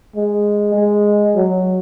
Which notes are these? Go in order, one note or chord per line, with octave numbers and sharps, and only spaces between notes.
G#3
G#3
F#3